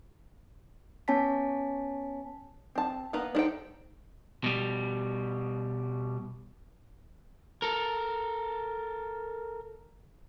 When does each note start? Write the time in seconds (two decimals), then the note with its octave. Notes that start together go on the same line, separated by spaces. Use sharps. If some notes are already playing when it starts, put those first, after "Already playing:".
1.08 B3 C#4 C#5 G#5 A5 B6
2.75 C4 A5
3.13 A#3 B3 B4 A#5
3.35 D4 D#4 A4 C5 G5
4.44 B2 G3
7.62 A4 A#4